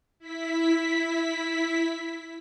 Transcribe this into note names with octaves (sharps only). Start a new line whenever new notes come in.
E4 B6